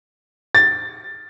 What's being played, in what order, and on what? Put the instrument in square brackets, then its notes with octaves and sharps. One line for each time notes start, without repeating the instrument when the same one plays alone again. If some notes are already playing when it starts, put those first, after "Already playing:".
[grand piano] A6